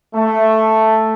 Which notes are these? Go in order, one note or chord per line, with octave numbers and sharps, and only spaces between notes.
A3